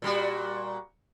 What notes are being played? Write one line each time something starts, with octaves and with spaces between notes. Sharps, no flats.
A#2 G3 F#4